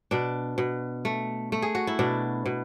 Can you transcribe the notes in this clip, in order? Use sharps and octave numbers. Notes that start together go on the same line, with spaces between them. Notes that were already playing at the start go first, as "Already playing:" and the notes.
B2 D4
B2
A3
A3
G#4
F#4
E4
B2 D4
B2